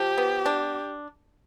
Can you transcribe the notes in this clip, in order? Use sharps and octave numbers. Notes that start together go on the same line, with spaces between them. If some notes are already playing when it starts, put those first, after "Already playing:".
Already playing: F3 G4
B3
D4